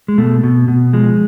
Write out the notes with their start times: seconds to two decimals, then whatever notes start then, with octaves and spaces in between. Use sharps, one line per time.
0.08 G#3
0.18 B2 A3
0.43 B2
0.68 B2
0.93 F3 G#3